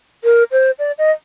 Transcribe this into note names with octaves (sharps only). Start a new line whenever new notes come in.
A#4
C5
D5
D#5